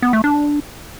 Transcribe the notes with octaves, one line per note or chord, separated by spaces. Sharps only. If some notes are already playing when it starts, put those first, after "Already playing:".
B3
A3
D4